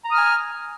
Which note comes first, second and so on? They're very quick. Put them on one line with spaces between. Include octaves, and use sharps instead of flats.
A#5 D#6 F6 G#5